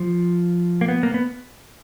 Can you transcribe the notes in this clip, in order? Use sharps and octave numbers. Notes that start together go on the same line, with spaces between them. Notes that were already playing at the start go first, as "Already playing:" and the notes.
Already playing: F3
A#3
B3
A#3
B3